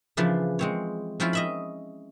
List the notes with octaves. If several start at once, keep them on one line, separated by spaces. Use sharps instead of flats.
C#3 E3 F3 D4 E4
G#3 C4 C#5
F3 C4 C#4 E4 F4
D#5 E5 B5